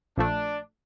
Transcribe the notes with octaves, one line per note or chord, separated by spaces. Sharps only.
A#1 F3 A3 D4